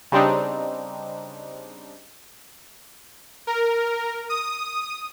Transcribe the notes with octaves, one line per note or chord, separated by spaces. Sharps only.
C#3 G3 C4 D4 D#4
A#4
D#6